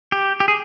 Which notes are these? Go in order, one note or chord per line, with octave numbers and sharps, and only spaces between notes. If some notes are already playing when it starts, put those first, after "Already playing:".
G4
G4
G#4